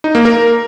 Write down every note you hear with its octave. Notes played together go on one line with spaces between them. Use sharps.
D#4
A#3
A#4